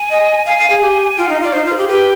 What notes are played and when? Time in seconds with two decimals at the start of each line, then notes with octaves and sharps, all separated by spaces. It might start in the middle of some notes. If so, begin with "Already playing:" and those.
Already playing: G#5
0.10 D#5
0.46 F5 G#5
0.58 F5
0.70 G#4
0.82 G4
1.18 F4 G5
1.27 D#4 F5
1.36 D#5
1.41 F4 D5
1.53 D#4 C5
1.65 F4
1.72 G#4
1.78 G4
1.88 G4 B4